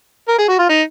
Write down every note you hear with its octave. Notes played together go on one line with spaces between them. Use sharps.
A#4
G#4
F#4
F4
D#4